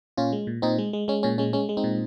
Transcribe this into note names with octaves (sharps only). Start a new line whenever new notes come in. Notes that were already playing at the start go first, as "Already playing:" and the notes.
A#2 C#4 F4
G#3
A#2
A#2 C4 D#4
G#3
G#3
G#3 C#4
A#2 C#4
G#3 C#4
G#3 C#4
G#3
C4 D#4
A#2